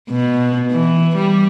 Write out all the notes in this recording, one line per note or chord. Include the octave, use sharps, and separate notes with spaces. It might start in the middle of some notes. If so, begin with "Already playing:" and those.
B2
E3
G3